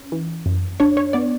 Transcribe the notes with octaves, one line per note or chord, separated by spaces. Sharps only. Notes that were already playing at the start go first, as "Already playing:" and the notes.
Already playing: C#4
E3
F#2
D4 C#5
C#5
B3 D5